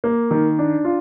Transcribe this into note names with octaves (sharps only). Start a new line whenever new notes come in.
A#3
D#3
D4
F4